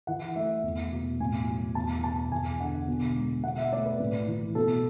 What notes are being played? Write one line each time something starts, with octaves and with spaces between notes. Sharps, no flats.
E3 F#5
A3 E5
E2
B2
A2 G#5
F#3
E2 A5
B2 A5
E2 G#5
D3 F#5
B2
G#3
B2 F#5
E5
A3 D5
B4
A2
E3
B2 A4